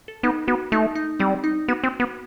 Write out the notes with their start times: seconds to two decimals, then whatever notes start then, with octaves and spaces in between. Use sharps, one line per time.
0.08 A4
0.23 B3 D#4
0.47 B3 F#4
0.72 A3 D#4
0.95 D#4
1.19 G3 C4
1.44 D#4
1.68 B3 F#4
1.84 C4
2.00 B3